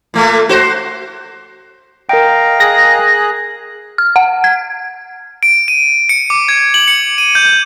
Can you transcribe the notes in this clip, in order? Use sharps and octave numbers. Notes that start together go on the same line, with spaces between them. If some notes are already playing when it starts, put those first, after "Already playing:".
A#2 A3 A#3
F#4 C5
A#4 D#5 F5 G5 A#5
G#4 F#6 A#6
F6
F#5
G#6
D7
D#7
C#7
D6
G#6
F#7
C#7
D#7
G6